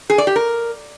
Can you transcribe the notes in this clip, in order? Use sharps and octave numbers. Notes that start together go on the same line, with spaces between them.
G#4
D5
G4
A#4